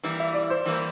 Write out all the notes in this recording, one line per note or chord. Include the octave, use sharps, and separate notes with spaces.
E3 G3 A#3 E4
E5
D5
C5
E3 G3 A#3 E4